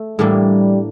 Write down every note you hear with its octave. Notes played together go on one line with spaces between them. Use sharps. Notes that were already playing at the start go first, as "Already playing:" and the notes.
Already playing: A3
A2 E3 G3 A#3 D4